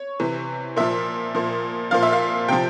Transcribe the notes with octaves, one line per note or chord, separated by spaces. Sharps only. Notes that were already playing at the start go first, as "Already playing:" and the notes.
Already playing: C#5
C3 E3
A#2 F3 E5
A#2 F3
A#2 F3 F5
E5
F5
C3 F3 G5